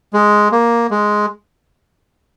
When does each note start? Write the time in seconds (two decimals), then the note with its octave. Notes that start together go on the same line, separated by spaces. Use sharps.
0.13 G#3
0.52 A#3
0.91 G#3